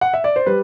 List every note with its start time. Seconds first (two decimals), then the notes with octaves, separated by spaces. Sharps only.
0.01 F#5
0.14 E5
0.24 D5
0.36 C5
0.46 G3 B4